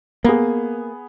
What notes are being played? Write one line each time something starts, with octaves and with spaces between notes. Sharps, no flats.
A#3 B3 G#4